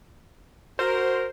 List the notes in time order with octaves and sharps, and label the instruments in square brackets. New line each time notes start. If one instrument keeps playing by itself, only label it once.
[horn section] F#4 A#4 [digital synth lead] C5